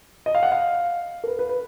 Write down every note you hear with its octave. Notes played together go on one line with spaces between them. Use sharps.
D#5
F5
F#5
F5
A#4
B4
B4
B4